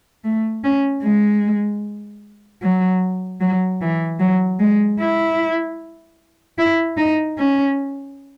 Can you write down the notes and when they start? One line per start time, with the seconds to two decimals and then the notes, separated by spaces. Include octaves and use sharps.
0.24 A3
0.64 C#4
1.03 G#3
2.62 F#3
3.40 F#3
3.81 E3
4.20 F#3
4.60 G#3
5.00 E4
6.58 E4
6.98 D#4
7.38 C#4